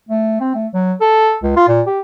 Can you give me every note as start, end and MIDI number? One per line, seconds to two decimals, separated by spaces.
0.09 0.38 57
0.41 0.54 60
0.55 0.67 57
0.74 0.94 54
1.01 1.37 69
1.44 1.54 37
1.57 1.66 65
1.68 1.82 46
1.87 2.01 67